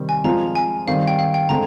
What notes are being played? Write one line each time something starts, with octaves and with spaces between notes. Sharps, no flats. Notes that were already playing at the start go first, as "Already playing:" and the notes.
Already playing: C3 D#3 G3 C4
G#5
F3 G#3 C4 F4 A#5
G#5
D#3 G3 C4 F5
G5
F5
G5
D3 G#3 C4 A#5